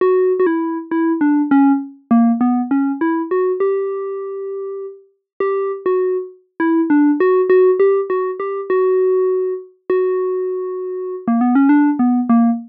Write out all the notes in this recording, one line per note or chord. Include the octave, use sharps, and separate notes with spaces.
F#4
F#4
E4
E4
D4
C#4
A#3
B3
C#4
E4
F#4
G4
G4
F#4
E4
D4
F#4
F#4
G4
F#4
G4
F#4
F#4
A#3
B3
C#4
D4
B3
A#3